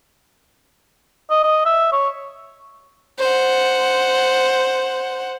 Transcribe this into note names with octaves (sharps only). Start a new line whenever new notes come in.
D#5
D#5
E5
C#5
C5 F#5